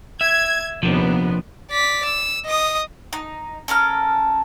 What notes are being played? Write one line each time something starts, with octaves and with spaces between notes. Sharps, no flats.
E5 G#6
D#2 C3 F3 B3 D4
D5 B6
E6
D#5 D#6
D#4
C#4 A4 A#4 F6